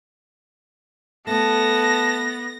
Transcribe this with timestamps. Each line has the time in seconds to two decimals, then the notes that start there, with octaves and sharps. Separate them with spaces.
1.27 A3 B3 A5 A#6